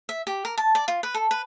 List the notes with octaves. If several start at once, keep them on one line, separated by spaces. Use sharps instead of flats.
E5
G4
A#4
A5
D5
F4
B4
A4
B4